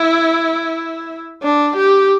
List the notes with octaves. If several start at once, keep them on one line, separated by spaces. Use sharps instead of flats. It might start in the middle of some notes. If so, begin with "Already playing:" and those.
Already playing: E4
D4
G4